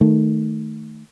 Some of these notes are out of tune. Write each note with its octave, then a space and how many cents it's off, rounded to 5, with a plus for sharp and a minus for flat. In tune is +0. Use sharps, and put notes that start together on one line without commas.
D#3 +0 A3 +0